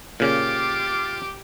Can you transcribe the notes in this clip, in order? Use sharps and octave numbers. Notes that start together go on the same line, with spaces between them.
A#2 C#3 F4 G4 D6